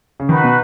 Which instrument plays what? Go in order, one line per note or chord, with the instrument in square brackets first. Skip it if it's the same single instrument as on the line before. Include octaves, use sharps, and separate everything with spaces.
[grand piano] C#3
[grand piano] D#3 [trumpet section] D#4 F#4 B4
[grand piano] B2